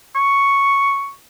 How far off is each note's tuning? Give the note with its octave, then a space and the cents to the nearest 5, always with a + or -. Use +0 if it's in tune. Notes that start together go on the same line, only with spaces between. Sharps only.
C#6 +0